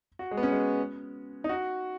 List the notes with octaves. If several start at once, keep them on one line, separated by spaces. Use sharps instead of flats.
F#4
G#3
B3
C#4
G#3
D#4
F#4